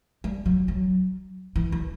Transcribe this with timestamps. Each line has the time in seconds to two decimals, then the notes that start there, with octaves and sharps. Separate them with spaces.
0.24 G3
0.46 F#3
0.68 F#3
1.56 E3
1.72 E3